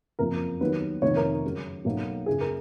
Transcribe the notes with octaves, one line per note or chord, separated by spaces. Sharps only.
F#1 F2 F3 A#3 A#4
D#2 D#3 F#3 B3 B4
F1 F2 D#3 A#3 C#5
A#4
F#2 C#3 F#3
B1 B2 F#3 A#3
F#1 F#2 C#3 G#4
A#4